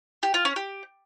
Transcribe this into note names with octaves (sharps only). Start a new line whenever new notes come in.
G4
F4
C#4
G4